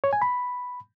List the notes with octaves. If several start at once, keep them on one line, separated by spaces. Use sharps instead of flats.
C#5
G#5
B5